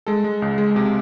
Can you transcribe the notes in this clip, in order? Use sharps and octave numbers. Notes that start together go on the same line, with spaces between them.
G#3 A4
G#3
C#2
G#3
C3